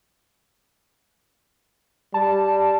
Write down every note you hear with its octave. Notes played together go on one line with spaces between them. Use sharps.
G3 A5